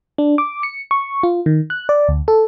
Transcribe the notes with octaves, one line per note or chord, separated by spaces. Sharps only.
D4
D6
C#7
C#6
F4
D#3
F#6
D5
D2
A4